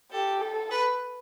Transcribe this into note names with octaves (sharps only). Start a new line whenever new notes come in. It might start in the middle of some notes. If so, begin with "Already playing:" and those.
G4 A4
A4
B4